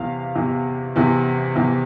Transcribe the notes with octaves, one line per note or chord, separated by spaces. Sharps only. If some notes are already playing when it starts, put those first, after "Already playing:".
Already playing: E2 C3 E3 F5
E2 C3 E3
E2 C3 E3
E2 C3 E3